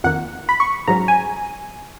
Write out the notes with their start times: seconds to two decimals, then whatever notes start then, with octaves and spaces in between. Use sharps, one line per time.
0.04 F2 D#3 A#3 F#5
0.49 B5
0.60 C#6
0.87 G#2 F#3 C#4 A#5
1.08 G#5